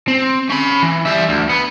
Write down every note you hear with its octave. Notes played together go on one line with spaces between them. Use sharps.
C4
C#4 B5
E3
G3 E5
D2
B3